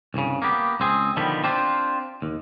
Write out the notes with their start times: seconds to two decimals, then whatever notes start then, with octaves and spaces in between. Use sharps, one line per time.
0.14 C2 G2 C#3
0.42 A#3 B3 G4
0.80 C#2 C4 G#4
1.16 B2 D3 D#3 F3 G3 B3
1.44 C4 D4 F4 G4 C5
2.22 D#2